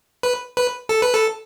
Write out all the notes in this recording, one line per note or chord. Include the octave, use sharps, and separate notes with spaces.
B4
B4
A4
B4
A4